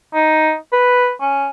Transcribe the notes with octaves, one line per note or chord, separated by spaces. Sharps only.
D#4
B4
C#4